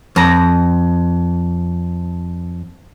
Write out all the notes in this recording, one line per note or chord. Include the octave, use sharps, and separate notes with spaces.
F2 A#5